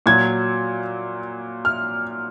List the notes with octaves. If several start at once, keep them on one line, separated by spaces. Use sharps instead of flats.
A#2 F#3 G#6
F6